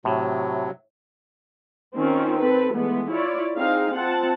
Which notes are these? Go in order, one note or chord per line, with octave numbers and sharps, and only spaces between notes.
A2 C3 F#3
D#3 C4 C#4 F4
C4 A4 B4
E3 G#3 A3 B3
E4 F4 C#5 D5
C4 D#4 G#4 F5
C4 F4 F#5 A5